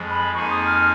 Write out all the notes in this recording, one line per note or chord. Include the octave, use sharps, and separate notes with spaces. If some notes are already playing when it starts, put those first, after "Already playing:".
Already playing: F2 F3 G#3
B5
F2 F3 A#3 D#4 G#4 C#6
D#6
F6